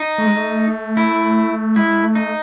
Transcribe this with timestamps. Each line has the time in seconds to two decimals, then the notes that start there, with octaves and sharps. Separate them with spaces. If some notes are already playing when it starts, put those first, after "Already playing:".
Already playing: D#4
0.18 A3
0.26 G#3
0.36 A3
0.97 E4
1.76 G#3 E4
2.03 A3
2.15 D#4